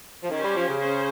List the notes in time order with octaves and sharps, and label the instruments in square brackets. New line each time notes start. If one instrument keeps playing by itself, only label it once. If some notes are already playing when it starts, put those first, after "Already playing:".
[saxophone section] F3
[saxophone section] D#3 [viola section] C#4 G4 C5
[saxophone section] G3
F3
C#3
[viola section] C#4 G#4 C5